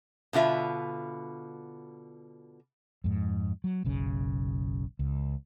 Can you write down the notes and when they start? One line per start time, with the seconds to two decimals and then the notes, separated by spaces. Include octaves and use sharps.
0.33 B2 D3 F4 E5
3.04 F2 G#2
3.64 F#3
3.84 F#1 B1 C#3
4.99 C#2